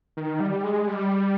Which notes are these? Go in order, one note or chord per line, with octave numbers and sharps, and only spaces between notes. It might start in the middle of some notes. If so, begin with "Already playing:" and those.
D#3
G3
G#3
G3